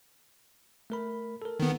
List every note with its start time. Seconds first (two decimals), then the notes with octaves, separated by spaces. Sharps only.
0.90 A3 A#4 B5
1.42 A4 A#4
1.59 D#3 B3